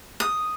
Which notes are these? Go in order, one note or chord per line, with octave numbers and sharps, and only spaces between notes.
D#6